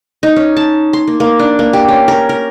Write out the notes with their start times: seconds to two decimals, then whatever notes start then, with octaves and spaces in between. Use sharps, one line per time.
0.23 D#4
0.36 C#4
0.57 A5
0.93 C6
1.07 A#3
1.20 A#3
1.39 D4
1.59 A#3
1.73 G4
1.88 C#4
2.08 A#4
2.29 A#4